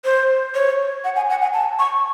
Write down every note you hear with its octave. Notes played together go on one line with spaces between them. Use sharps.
C5
C#5
F#5
G#5
F#5
G#5
A5
C#6